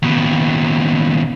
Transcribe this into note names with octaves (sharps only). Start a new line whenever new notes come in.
D#2 B2